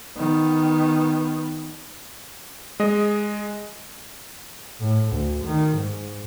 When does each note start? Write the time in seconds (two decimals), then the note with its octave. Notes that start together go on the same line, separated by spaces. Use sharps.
0.17 D#3 B3
2.80 G#3 D#5
4.80 A2
5.12 D2
5.45 D#3
5.77 G#2